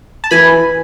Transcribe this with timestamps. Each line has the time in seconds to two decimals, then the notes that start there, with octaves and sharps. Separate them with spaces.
0.24 A5
0.31 E3 G#5 B5